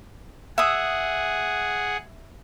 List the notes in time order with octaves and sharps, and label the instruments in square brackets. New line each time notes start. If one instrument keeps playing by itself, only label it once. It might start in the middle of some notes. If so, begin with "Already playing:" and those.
[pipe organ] G#4 F#5 [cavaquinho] E5 D#6